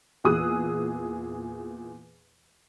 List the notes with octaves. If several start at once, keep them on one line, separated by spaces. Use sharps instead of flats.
E2 A#2 G#4 D#6 E6 F#6